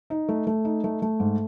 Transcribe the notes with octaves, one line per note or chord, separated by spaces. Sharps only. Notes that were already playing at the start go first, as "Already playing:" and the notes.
D#4
A3
A3
D#4
A3
A3
G#2